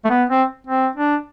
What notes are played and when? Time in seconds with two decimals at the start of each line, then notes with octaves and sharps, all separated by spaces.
0.05 A3
0.10 B3
0.30 C4
0.67 C4
0.96 D4